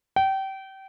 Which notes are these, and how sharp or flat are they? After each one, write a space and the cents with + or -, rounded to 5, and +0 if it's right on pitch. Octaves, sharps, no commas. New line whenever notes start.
G5 -25